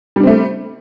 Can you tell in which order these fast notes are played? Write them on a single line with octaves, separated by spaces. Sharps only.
G3 D4 C4 A3